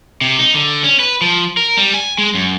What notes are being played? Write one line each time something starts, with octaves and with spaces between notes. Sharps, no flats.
C3
D#4
D3
C#4
B4
F3
A#4
G3
G#5
G#3
F#2